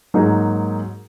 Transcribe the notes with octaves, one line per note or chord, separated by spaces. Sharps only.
G#2 F#3 A#3 D#4 G#4